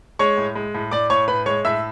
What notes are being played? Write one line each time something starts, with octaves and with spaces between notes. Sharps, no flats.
G#3 C#5 C#6
A2
G#3
A2
A2 D5 D6
A2 C#5 C#6
A2 B4 B5
G#3 C#5 C#6
A2 E5 E6